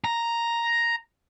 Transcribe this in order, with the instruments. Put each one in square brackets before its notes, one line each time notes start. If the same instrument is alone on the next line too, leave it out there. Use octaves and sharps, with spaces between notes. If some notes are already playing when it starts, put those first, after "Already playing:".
[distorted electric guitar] A#5